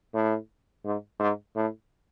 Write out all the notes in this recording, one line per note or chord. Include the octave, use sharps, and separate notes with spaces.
A2
G#2
G#2
A2